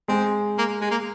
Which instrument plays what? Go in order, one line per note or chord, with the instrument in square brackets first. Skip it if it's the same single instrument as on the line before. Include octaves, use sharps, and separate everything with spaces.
[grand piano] G#3 [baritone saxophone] C4
[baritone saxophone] A#3
G#3
A#3